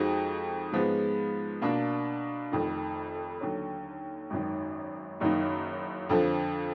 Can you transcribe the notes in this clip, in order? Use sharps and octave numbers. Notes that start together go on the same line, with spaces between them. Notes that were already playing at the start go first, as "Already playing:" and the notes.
Already playing: F2 F3 G#3 D#4 F#4
G#2 F3 G#3 B3
B2 A#3 D4
F1 F2 D#3
D#2 D3 F#3
G#1 F#2 D#3
F#1 F#2 D#3 A#3 D#4
F2 D3 F3